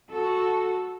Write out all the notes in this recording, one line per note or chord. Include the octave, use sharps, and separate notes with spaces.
F#4 A4